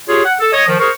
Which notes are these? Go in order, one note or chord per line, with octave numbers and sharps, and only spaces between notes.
F4 G4 G#4 C#5
F#5
A4
C#5 D#5
D#3 F3
G#4 A#4 C5 C#6